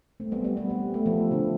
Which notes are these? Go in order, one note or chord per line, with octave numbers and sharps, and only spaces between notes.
A3 C4
G3 B3
G3 B3
G3 B3
G3
A3
F3
D3